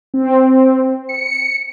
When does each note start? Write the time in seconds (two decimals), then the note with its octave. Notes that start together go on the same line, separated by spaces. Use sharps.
0.14 C4
1.09 C#7